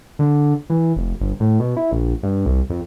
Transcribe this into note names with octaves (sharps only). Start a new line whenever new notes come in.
D3
E3
F1
G1
A2
B2
E4
A#1
G2
C2
F2